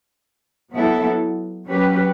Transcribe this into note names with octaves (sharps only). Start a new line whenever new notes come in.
F#3 B3 E4 A4
F#3 C#4 G4 B4